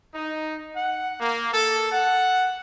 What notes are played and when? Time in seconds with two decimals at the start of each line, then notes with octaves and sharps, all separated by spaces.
0.13 D#4
0.75 F#5
1.18 A#3
1.53 A4
1.91 F#5